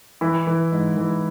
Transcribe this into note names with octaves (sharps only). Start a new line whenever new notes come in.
E3 E4
E3
G#2
E3